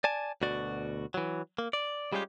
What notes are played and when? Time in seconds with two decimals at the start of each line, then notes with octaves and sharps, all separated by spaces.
0.04 D5 G#5 A5
0.42 D2 B2 F#4 D5
1.14 E3 F#3
1.58 A#3
1.73 D5
2.13 G3 G#3 C#4 F4 G4